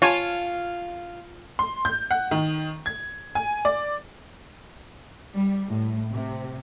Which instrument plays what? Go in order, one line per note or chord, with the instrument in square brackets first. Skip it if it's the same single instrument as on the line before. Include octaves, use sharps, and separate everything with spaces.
[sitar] F4 [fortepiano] C#5 G#5 A5
[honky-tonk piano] C6
G6
F#5
D#3
G#6
G#5
D5
[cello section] G3
A2
C3